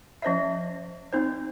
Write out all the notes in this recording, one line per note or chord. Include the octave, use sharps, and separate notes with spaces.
F3 C#4 C5 D#5 E5
C4 D#4 C5